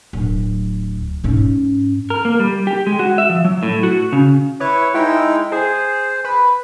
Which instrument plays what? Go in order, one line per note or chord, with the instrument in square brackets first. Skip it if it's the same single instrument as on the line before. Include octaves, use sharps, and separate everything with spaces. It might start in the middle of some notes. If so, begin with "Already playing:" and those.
[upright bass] D1
G#2 C#4
[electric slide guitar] A#4
A#3
G3
G4
G#3
F#4
E5
F3
F#3
A2
F#4
C#3
[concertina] E4 B4 [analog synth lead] C#5
[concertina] G#3 D#4 G5 [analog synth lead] E4
[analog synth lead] G#4 [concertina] C5
[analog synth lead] B4